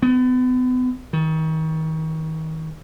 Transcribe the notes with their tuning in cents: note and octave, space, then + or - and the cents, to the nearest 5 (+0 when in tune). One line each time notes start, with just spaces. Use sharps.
B3 +35
D#3 +35